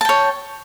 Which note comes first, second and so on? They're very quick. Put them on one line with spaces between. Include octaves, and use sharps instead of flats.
A5 G5 C#5